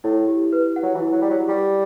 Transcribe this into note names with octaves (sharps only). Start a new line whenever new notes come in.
A2 E4
G4
B4
F#5
F#3
E3
E4
F#3
G3 G4
F#3
G3 G4